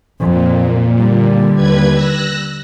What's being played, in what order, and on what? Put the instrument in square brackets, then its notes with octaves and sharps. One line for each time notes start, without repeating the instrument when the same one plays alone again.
[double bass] F2 [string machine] A#2
[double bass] D3 G3
[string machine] D#2 B4 G#6
E6 F#6 A#6